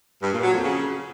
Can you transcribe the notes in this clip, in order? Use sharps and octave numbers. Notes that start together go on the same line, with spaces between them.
G2
A#2
F#3
F2
C#3